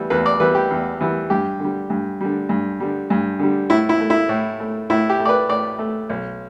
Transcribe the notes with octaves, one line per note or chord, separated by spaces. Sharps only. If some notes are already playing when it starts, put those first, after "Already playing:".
Already playing: E3 G3 B3
E2 B4
D5
E3 G3 B3 B4
G4
E2
E3 G3 B3
G2 G4
D3 G3
G2
D3 G3
G2
D3 G3
G2
D3 G3
A2 E4
E4
A3
E4
A2
A3
A2 E4
G4
A3
D5
B4
A2 D5
A3
B1